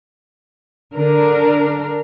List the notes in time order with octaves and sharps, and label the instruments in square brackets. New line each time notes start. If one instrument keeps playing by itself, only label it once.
[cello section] D3 D4 A#4